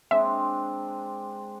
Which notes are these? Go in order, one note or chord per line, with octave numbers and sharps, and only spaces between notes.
G#3 C4 D4 E5